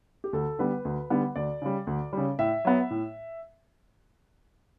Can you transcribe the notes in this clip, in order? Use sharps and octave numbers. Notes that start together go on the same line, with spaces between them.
G4
D2 A4
D3 G3 B3 B4
D2
D3 G3 B3
D2 D5
C#3 G3
D2
C#3 G3
A2 E5
F#3 B3
A2